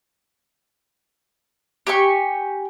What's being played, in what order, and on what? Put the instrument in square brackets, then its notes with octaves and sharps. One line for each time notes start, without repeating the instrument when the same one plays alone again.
[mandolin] G4 G#5 C#6